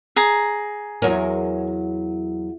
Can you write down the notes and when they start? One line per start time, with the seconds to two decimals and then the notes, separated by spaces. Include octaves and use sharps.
0.16 G#4 A#5
1.02 E2 F#3 A#4 C#5 G#5